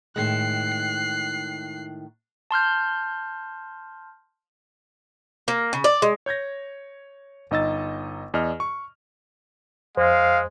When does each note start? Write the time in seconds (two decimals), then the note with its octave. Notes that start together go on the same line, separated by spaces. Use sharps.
0.16 A2 D#3 G#3 F#6 C7
2.51 A5 C6 F6 G6
5.48 A#3
5.73 C#3
5.84 D5
6.02 G#3
6.26 C#5 G6 G#6 A#6
7.51 G1 D#4 D#5 E6 A6
8.34 E2 D5 D#5 F6
8.60 C#6
9.97 F2 G#3 C5 F5